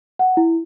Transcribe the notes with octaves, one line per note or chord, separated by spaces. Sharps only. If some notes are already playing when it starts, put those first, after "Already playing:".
F#5
E4